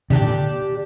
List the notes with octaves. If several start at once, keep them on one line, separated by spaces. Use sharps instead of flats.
C3 D#3 G3 D4 G4
A#2 D3